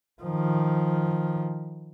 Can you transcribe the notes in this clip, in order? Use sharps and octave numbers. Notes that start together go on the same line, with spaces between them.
D#3 F3